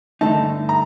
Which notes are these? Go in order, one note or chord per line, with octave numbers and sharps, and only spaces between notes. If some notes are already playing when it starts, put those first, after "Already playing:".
G2 D3 A3 D#4 A5
A#5